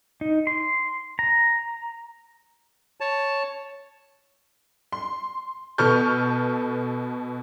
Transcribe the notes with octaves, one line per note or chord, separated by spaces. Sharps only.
D#4
C6
A#5
C#5 A5
C6
B2 A4 B4 C#6 F6 G6